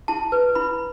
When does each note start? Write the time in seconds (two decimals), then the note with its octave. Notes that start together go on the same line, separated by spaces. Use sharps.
0.08 E4 A5
0.32 B4
0.55 E4 B5